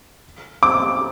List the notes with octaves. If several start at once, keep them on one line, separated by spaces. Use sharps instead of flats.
D6